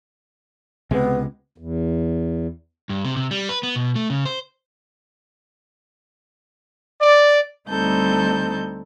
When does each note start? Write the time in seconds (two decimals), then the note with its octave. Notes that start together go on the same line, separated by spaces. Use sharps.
0.91 C#2 C3 G#3 B3
1.58 E2
2.89 G2
3.05 C3
3.17 C3
3.31 G3
3.49 B4
3.63 B3
3.76 B2
3.96 A3
4.10 C#3
4.25 C5
7.01 D5
7.69 D2 G3 C4 D#4 A4 G6